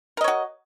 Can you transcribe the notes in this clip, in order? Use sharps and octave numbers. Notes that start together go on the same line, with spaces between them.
F#4 A#4 C#5 D#5